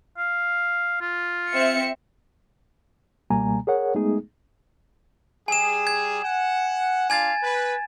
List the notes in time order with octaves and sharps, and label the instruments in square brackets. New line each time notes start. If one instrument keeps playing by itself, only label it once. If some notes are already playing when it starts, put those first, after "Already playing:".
[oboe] F5
F4
[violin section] C4 E5 C#7
[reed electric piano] C#2 B2 G3 A#3 G#5 A#5
G#4 A#4 C#5 F#5
G#3 A3 B3 D#4 G#4
[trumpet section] G3 G#4 [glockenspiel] G#5 E7
[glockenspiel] G#6
[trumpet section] F#5
[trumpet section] D4 F4 F5 [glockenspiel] G#5 G#6 A6
[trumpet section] B4